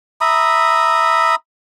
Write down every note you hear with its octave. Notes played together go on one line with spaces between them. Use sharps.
E5 A#5 B5 D#6